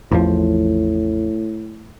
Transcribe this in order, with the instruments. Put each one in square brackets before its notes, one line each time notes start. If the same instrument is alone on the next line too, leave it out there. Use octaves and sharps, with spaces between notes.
[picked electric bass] A1 E2 F3 [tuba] A2